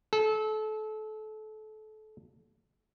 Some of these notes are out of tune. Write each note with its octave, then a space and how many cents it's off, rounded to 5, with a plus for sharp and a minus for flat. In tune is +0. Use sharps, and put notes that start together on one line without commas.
A4 -30